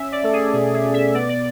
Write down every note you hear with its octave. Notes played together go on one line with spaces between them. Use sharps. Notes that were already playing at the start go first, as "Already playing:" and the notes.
Already playing: C#4 E5
D5
A3 A4
G#4
B2 G#4
G#4
B2
E5
B3 D5
D5